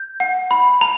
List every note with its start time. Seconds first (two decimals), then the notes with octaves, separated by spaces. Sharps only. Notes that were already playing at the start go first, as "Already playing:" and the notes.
Already playing: G6
0.20 F#5
0.51 B5
0.81 A#5